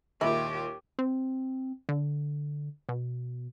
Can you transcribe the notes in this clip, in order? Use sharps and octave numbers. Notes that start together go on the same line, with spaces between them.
D#2 A#2 G#3 E4 G4
C4
D3
B2